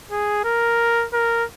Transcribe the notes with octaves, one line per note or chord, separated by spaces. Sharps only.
G#4
A#4
A#4